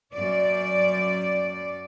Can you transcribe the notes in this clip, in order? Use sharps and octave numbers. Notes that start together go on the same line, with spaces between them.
F#2 D5